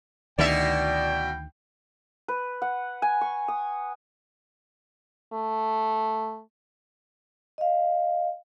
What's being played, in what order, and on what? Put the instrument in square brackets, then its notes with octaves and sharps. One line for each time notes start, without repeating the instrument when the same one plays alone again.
[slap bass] D2 D#3 [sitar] B2 E4 E5 [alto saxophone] D5 [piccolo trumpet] G5
[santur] B4
F#5
G#5
C#6
D#6
[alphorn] A3
[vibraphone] D#5 F5